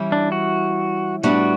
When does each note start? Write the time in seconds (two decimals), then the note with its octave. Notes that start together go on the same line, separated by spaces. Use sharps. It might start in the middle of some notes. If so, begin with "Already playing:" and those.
Already playing: E3 G3 C#4 E4
0.12 D4
0.32 F#4
1.23 A2 G3 B3 D4 F#4